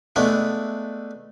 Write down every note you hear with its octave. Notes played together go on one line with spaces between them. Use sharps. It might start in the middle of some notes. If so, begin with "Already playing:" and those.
G#3 A3 B3 D4 E4